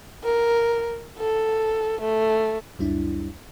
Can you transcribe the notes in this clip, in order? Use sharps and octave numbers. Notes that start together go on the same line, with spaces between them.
A#4
A4
A3
C#2 F#2 G3 D4 E4